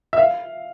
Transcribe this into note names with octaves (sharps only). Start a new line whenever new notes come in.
E5
F5